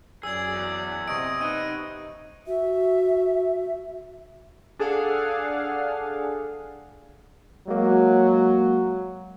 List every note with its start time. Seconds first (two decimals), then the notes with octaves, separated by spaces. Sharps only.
0.23 F#2 G#4 D5 E6 G#6
0.53 E2
1.08 C3 D#5 C#6 D7
1.41 B3 D#4 F#6 D#7
2.47 F#4 E5
4.79 D4 G#4 A4 F5 F#5
7.68 F#3 G#3 A#3